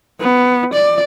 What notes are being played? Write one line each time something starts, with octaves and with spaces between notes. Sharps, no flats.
B3
D5